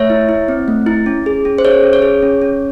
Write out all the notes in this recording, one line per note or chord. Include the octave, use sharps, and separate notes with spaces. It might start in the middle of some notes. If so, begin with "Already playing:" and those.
Already playing: A3 C#5 E5
E4
E4
C4
A3
E4
C#4
G#4
C#4
C5
G#4 C#5
C#4
C#5
G#4
C#4
C#4